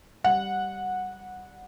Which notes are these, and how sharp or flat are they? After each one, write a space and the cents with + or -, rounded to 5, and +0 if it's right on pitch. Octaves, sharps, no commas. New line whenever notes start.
G3 +0 F#5 -15